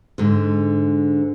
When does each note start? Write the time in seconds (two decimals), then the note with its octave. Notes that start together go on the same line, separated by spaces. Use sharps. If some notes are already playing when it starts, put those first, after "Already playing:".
0.18 G#2 D3